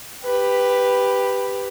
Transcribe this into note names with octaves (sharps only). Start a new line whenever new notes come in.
G4 B4